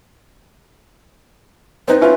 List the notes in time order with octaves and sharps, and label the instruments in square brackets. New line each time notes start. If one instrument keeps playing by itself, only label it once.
[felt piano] C4 D#4 [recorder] B4
[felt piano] C#4 E4 F4 [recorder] B4